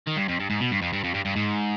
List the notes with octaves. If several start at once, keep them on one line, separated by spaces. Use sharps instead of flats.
D#3
G2
F2
G2
G#2
B2
G2
F2
G2
F2
G2
G2
G#2